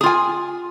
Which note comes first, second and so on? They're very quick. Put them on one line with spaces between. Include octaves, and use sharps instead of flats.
G#4 F4 G#5